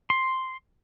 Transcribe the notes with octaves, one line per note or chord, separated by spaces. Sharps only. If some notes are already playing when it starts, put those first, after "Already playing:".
C6